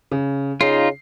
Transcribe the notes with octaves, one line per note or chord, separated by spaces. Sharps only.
C#3
C#3 D#4 F4 C7